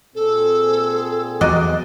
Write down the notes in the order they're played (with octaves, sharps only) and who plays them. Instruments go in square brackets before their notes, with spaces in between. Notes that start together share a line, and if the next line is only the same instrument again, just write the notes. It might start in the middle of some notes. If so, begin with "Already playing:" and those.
[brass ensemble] A#2 C4 G#4 [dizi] A4
[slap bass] E2 F#3 [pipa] F#4 D5 D#5